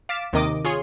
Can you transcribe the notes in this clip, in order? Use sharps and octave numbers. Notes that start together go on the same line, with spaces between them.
F5 D6 A6 B6 D7 E7
D#2 C3 D#3 D#5 D6
F4 G#4 C#5 C6